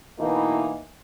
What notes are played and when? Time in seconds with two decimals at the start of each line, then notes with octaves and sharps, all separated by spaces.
0.19 B2 E3 A#3 D#4 E4